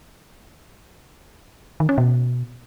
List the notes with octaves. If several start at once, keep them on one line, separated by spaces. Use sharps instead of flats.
D#3
C#4
B2